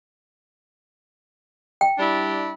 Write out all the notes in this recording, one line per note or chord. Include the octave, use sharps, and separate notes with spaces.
G5
G3 D4 E4